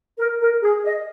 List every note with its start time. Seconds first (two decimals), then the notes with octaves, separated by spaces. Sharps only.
0.19 A#4
0.40 A#4
0.62 G#4
0.84 D#5